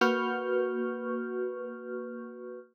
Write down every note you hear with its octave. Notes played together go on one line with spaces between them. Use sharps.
A#3 F#4 B4 C#6 F6 G6